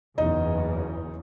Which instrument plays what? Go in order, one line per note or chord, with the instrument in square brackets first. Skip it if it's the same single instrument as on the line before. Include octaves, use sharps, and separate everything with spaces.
[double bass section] F#1 E2 C#3 [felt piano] D#4 D#5